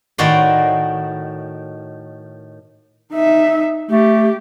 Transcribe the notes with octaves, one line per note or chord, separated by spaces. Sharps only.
A2 D#3 F#4 C#5 D5 C6
D#4 E5
A3 G4